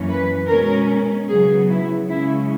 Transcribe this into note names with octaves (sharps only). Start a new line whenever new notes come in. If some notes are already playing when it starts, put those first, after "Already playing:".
Already playing: F#2 E3 A#3 C#4
B4
B2 G#3 C#4 A#4
C#3 F#3 B3 G#4
E4
C#3 G#3 C#4 E4